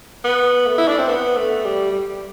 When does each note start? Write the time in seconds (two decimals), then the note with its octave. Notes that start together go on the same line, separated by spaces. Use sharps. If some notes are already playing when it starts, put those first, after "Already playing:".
0.25 B3
0.67 A3
0.78 E4
0.88 D4
0.98 C4
1.09 B3
1.37 A3
1.65 G3
1.92 G3